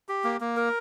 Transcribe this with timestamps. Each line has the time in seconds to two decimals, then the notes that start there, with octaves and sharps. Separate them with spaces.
0.09 G4
0.24 A#3
0.40 A#3
0.57 A#4